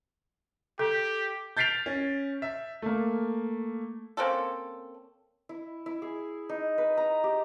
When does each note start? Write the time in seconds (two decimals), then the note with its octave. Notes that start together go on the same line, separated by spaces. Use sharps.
0.79 G4 A4
1.57 G6 A6 B6 C7 D7 F7
1.86 C#4
2.42 E5
2.82 A3 A#3
4.17 A#3 C4 C#4 A4
5.49 E4
5.86 E4
6.02 G#4
6.49 D#4
6.78 B4
6.97 A#5
7.24 G4